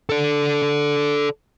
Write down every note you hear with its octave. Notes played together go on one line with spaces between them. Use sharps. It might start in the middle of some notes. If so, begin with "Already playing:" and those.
A4 D5